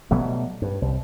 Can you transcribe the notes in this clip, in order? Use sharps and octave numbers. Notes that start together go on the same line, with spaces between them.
B2 F#3 G3 A3
G2
C2